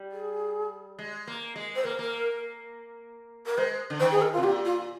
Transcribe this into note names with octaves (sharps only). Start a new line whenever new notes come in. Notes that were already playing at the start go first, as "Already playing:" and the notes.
Already playing: G3
G#4
G#3
A#3
G#3
C5
A#3 A#4
A#3
A#4
G#3 C5
D3
D#3 C5
G#4
A#4
C3 F4
A#2 G4
F4